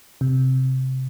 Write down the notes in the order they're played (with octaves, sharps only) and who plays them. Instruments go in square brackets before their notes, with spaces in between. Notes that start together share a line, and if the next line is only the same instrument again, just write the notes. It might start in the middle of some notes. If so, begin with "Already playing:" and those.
[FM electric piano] C3